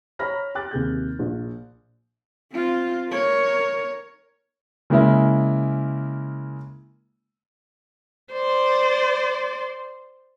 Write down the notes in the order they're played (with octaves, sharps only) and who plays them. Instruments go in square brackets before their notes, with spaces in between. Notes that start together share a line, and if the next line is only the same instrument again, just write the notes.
[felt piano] C#5 A#5 B5 F6 A#6
G5 D6 F#6 A6
D#2 C3 G#4 G6
A#1
[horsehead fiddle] C4 F4
A#4 C#5
[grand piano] C#3 G#3 A#3 E4
[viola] C5 D5